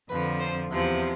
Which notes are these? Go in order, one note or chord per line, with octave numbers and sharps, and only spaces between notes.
F2 D3 F3 B4
C5
E2 C3 F3